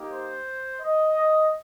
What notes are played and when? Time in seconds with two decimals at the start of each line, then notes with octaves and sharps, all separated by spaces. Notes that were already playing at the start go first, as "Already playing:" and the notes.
Already playing: A#3 D#4 G4
0.11 C5
0.80 D#5